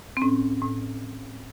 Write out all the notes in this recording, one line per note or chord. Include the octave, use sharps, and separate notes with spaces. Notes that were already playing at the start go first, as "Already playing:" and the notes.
C4
A2 C#4
A2